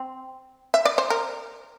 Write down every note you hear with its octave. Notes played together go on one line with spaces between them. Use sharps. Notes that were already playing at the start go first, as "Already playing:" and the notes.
Already playing: C4
E5
D5
C5
A#4